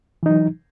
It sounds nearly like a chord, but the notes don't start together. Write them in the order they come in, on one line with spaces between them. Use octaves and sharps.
E3 D#4 F#3